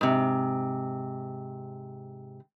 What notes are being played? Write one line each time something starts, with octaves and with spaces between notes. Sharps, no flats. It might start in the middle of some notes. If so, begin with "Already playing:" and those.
G#2 C3